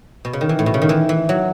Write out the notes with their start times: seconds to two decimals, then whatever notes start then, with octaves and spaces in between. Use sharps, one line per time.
0.25 B2
0.33 C#3
0.41 D#3
0.49 E3
0.59 A2
0.66 B2
0.74 C#3
0.82 D#3
0.89 E3
1.09 E3
1.29 F#3